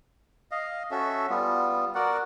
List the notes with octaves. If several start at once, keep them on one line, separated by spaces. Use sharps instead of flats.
D#5 F5
C#4 F#4 A4 E5
G3 B3 F4
F#4 A#4 D5 F#5